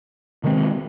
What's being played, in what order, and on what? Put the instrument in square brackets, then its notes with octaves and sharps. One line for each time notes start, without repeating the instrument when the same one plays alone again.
[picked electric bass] C3 D#3 G#3 C4